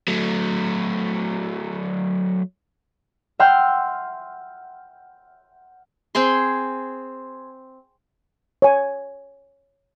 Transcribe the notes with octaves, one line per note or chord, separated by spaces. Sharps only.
F#3 A3
E5 F#5 G5 C6 F6
C4 G#4 C6
C#5 G#5